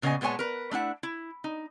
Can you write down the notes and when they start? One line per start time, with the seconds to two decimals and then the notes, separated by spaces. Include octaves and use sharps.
0.02 A#2 C#3 B3 D#4 D#5 G#5
0.21 A#2 G#3 B3 C#5 G#5 A5
0.39 A#4 B4
0.71 A3 D4 E4 F#5
1.03 E4
1.44 D#4